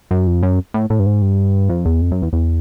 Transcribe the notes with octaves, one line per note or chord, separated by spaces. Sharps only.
F#2
F2
F#2
A2
A2
G2
G#2
G2
F2
E2
F2
F#2
E2
E2